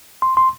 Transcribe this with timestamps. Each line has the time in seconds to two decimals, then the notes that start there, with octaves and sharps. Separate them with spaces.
0.22 C6
0.37 C6